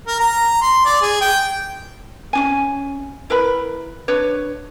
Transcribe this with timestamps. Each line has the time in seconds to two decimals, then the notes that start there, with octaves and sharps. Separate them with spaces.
0.07 A#4
0.20 A#5
0.62 C6
0.85 D5
1.01 G#4
1.21 G5
2.33 C#4 D4 G#5
3.30 E4 A#4 B4 B5
4.08 D4 B4 C#5